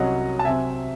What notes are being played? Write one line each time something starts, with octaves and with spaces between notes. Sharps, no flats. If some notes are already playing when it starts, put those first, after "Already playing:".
Already playing: C2 C3 F#3 C#4 D#5 F#5
A5
C3 F#3 C4 E5 G#5